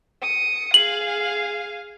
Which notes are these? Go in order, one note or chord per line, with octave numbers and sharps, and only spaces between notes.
D#6 C#7
G#4 F5 F#7